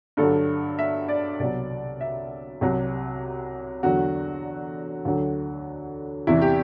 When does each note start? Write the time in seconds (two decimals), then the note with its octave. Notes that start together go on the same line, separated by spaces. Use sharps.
0.17 G2 D3 F#3 A4
0.79 E5
1.08 D5
1.39 C2 B2 F#3 D5
2.01 E5
2.61 C2 C3 F#3
3.83 E2 D3 F#3 F#4
5.05 D2 D3 F#3
6.27 E2 C3 E3 E4
6.42 G4